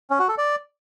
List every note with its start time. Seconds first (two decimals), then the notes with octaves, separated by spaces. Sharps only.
0.10 C#4
0.19 F#4
0.29 A4
0.38 D5